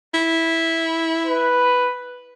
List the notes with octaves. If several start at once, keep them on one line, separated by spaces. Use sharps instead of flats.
E4
B4